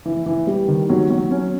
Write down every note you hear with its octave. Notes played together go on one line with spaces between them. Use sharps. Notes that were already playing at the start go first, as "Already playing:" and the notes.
E3
E3
G3
D#3
F#3
F#3
C#4